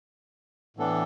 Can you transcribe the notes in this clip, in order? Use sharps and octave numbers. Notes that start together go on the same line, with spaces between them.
A2 E3 B3 D4 A4